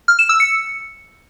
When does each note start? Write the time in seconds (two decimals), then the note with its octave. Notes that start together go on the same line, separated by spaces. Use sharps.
0.08 F6
0.19 E7
0.29 E6
0.40 C#7